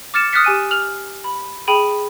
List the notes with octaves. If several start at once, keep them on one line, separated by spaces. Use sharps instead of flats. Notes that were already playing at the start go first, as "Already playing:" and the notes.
D6 F6 A6 C#7 E7
D#6 F6 F#6 A6 B6 C#7
G4 G#5 D#7
F6 F7 F#7
B5
G#4 G5 B5 D#7